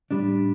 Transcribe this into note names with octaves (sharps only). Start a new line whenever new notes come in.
A2 G3 D4